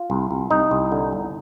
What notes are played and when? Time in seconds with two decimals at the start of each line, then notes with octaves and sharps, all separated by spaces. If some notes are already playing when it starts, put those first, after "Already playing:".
Already playing: F4
0.10 C2
0.31 C2
0.51 C2 D#4
0.71 C2
0.92 D3
1.13 G1